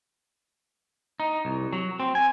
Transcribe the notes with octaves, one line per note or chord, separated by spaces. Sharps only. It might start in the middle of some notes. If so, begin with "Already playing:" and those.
D#4
C2
F#3
C4
G#5